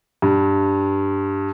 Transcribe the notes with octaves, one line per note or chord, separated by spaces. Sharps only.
G2